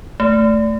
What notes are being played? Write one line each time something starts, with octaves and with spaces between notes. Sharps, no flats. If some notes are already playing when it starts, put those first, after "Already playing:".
A3